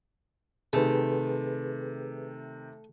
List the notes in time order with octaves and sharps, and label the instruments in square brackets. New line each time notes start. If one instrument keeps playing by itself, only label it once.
[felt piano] C3 D#3 [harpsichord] A3 [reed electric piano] G#4 B4